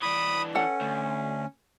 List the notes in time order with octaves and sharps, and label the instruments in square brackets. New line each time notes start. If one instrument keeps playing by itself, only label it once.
[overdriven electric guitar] E3 D4 [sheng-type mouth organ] B5 D#6
[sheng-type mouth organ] C#4 [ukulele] A4 B4 F#5
[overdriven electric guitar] D2